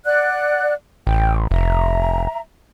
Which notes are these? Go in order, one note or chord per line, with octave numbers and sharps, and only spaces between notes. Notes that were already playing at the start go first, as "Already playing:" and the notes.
D5 F#5 F#6
A1 G5
F1 E5 A#5